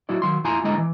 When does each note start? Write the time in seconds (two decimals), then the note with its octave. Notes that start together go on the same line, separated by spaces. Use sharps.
0.09 F#3 E4 F#4 D5
0.22 D#3 F#3 C6
0.44 F2 F3 E4 G#5 A#5 C6
0.64 D3 G#3 E4 D#5 A#5
0.78 E3